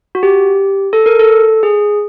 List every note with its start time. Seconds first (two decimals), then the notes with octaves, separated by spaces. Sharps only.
0.15 F#4
0.23 G4
0.93 A4
1.06 A#4
1.19 A4
1.63 G#4